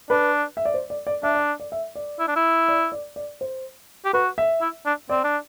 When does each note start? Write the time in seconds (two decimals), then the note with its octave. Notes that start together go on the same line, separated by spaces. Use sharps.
0.10 D4 B4
0.57 E5
0.65 D5
0.74 C5
0.90 D5
1.07 D5
1.23 D4 E5
1.35 D5
1.60 D5
1.72 E5
1.95 D5
2.19 E4
2.28 D4
2.36 E4
2.68 D5
2.92 D5
3.16 D5
3.41 C5
4.05 G4
4.13 F#4 B4
4.38 E5
4.61 E4
4.86 D4
5.10 C4 D5
5.24 D4